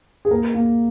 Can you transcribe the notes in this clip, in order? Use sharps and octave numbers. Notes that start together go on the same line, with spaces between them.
G#4
A#3 A#4
A#3